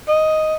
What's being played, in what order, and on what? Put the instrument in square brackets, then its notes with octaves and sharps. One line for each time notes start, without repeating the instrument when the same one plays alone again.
[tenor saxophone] D#5